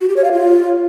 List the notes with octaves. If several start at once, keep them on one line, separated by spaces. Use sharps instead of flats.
F#4
G4
C#5
F5
F4